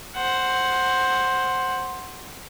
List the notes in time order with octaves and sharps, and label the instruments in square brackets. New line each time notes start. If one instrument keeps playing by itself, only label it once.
[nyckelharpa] C5 F#5